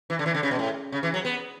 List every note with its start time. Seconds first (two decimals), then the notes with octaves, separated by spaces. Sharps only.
0.10 E3
0.19 D3
0.26 E3
0.34 D3
0.43 C#3
0.51 B2
0.59 A2
0.92 C#3
1.03 E3
1.14 F#3
1.25 B3